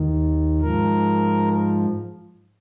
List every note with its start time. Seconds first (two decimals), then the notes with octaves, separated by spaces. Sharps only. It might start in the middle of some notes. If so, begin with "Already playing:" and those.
Already playing: D#2 D#3
0.61 G#2 F3 A#4